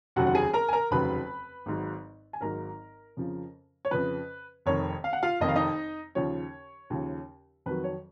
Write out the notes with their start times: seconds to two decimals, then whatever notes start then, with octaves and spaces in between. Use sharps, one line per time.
0.16 F1 D#2 C#3 F#3 F#4 F#5
0.27 F#5
0.35 G#4 G#5
0.53 A#4 A#5
0.68 G#5
0.73 A#4 A#5
0.91 F1 D#2 C#3 F#3 B4 B5
1.66 G#1 G#2 F#3
2.33 G#5
2.41 G#1 G#2 F#3 A#4 A#5
3.17 F2 C#3 F3
3.85 C#5
3.91 F2 C#3 F3 B4
4.66 F1 F2 D#3 C#5
5.04 F5
5.13 F#5
5.23 F4 F5
5.40 F1 F2 D#3 D#5
5.49 F5
5.56 D#4 D#5
6.15 D#2 C#3 F3 C#5
6.90 D#2 C#3 F3
7.66 F2 D#3 F#3 B4
7.84 C#5